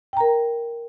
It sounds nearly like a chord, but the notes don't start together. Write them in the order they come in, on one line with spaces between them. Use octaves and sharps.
G5 A#5 A#4